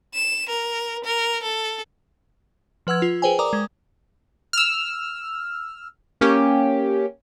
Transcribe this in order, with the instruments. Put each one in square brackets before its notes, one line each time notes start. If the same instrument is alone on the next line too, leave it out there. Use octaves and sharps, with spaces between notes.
[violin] E7
A#4
A#4
A4
[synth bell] F3 B4 F#5 E6 G#6
F4
G#4 B4 C5 G5 G#5
A#4 D5 A#5 D6 D#6
G#3
[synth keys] E6 F6
A#3 C#4 G4